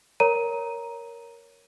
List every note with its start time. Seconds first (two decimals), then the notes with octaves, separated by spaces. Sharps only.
0.20 A#4 C#5 A#5 D#7